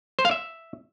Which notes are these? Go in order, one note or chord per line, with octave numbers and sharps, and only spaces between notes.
C5
F5
E5